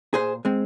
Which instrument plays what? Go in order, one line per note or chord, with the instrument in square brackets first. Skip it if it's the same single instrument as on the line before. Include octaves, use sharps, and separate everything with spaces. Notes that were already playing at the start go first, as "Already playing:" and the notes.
[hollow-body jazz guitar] A#2 G#4 C5
G#3 C4